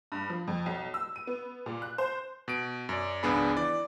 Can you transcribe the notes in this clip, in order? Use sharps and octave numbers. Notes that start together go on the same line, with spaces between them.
G2
F3
F2
B1
E6
D#7
B3
A#2
F#6
C5
B2 D7
F#2 D5
G#1 C#2 B3 D4 G#4 B5
E3 D5